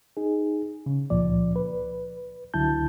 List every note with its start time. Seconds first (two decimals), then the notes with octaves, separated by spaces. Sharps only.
0.17 D#4 G#4
0.86 C#3
1.10 C#2 A#2 F3 D5
1.56 B4
2.54 C#2 D3 F#3 E4 A5 G6